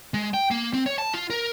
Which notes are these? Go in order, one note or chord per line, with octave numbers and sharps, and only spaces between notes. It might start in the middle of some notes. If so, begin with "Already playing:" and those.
G#3
G5
A#3
C4
C#5
A5
F4
A#4